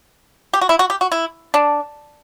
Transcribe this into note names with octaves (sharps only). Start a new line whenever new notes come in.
G4
F#4
E4
F#4
G4
F#4
E4
D4